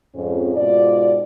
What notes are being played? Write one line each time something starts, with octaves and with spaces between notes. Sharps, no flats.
F2 G#2 C#4
G#2 B2 F4 D5